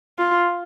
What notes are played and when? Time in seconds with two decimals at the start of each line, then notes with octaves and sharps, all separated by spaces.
0.19 F4